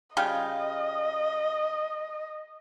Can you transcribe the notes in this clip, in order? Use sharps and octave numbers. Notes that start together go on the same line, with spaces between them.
C#3 G3 F4 D#5